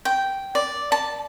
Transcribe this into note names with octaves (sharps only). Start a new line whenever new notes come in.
G5
D5
A5